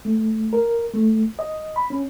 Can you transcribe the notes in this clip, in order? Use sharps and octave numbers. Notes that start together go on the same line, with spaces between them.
A3
A#4
A3
D#5
B5
C#4